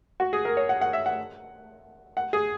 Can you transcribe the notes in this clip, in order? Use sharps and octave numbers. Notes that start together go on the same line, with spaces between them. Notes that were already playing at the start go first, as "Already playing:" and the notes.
F#4
G#4
A#4
C#5
F#5
F#5
E5
F#5
F#5
G#4